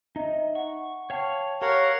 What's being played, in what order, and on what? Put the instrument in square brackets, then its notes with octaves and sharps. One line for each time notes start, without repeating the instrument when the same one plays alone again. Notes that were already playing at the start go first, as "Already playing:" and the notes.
[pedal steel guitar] D#4 [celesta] D#5 E5 A#5
[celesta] F#5 [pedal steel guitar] C#6
[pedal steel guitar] C#5 F5 [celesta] G5 A5 C#6
[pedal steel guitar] G4 [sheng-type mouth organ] A#4 F5 F#5 [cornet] C#5